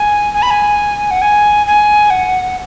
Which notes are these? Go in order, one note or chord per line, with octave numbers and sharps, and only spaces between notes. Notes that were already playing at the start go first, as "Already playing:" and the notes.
Already playing: G#5
G#5
B5
G#5
F#5
G#5
G#5
F#5